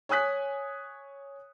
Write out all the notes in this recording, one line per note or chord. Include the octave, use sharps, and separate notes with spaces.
C#5 G#5 D#6 F#6 B6